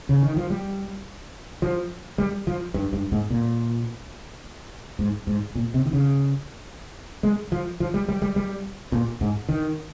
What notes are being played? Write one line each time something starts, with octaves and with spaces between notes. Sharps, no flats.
C#3
D#3
F3
G3
F3
G3
F3
G2
G2
G#2
A#2
G#2
G#2
A#2
C3
D#3
C#3
G#3
F3
F3
G3
G3
G3
G3
A#2
G#2
D#3